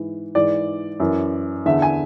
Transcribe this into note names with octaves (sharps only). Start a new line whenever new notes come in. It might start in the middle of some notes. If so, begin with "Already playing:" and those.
Already playing: G#2 E3
G#2 E3 D5
F#2 E3
E2 D3 E5
G#5